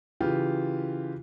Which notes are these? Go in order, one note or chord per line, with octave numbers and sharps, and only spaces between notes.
C#3 E3 F4 G4